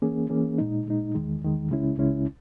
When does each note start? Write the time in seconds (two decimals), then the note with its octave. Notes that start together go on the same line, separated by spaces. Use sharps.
0.02 E3 A#3 C#4 G#4
0.30 E3 A#3 C#4 G#4
0.58 A#2 G#3 D#4
0.86 A#2 G#3 D#4
1.15 E2 D#3 G#3
1.42 E2 D#3 G#3
1.70 C#2 C#3 G#3 C#4 E4
1.97 C#2 C#3 G#3 C#4 E4